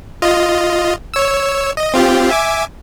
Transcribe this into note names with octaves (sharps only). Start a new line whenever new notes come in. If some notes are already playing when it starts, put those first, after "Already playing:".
F4 D#5
C#5 E6
D#5
C4 F4 G4
E5 G#5 D6